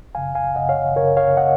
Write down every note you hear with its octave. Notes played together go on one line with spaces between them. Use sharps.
F#2 C#3 F5 G#5
F5 G#5
F#2 C#3 D#5 F#5
C#5 F5
F#2 C#3 A#4 C#5
C#5 F5
C#3 D#5 F#5